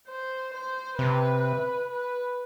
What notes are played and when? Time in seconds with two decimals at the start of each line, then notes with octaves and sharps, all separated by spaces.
0.08 C5
0.54 C5
0.98 C3 B4
1.89 B4